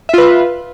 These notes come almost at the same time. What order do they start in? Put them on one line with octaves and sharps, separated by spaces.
E5 F4 B4